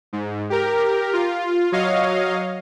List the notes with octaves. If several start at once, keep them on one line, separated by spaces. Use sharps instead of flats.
G#2
G4 A#4
F4
F#3 C#5 D#5 F5